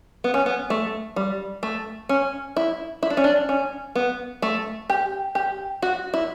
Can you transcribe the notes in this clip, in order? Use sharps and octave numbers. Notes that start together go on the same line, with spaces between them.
B3
C#4
B3
A3
G3
A3
C#4
E4
E4
D4
C#4
D4
C#4
B3
A3
G4
G4
F#4
E4